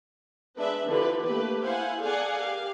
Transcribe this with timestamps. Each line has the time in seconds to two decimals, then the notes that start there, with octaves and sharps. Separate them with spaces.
0.57 G#3 D4 B4 E5
0.89 D3 E3 F3 G4 B4
1.24 A3 A#3 G4 B4
1.63 E4 C5 F5 F#5 G#5
2.00 G#4 A4 D5 F5 F#5 G#5
2.39 G4 A#4 F5